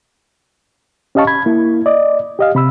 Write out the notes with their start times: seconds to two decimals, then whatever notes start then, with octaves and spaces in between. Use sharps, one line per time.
1.15 C#4 G4 D#5 F5 A5 C#6
1.27 B5 G#6
1.46 A#3 E4
1.86 D5 D#5
2.39 G4 D#5 F5
2.55 C3 B5 E6